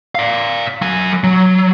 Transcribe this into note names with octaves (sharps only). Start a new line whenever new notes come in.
D5 F5
F#3 G#5
F#3